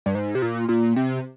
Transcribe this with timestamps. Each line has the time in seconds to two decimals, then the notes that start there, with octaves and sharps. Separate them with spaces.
0.06 G2
0.15 G#2
0.35 C3
0.42 A#2
0.69 A#2
0.96 C3